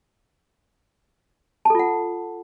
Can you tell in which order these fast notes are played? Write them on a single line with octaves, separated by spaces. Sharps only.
A5 A4 F4 F#5